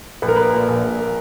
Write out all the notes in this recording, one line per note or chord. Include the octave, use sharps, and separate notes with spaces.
A#1 B4
A#4
A#3 B4
A#2
A#1
A#1
A#3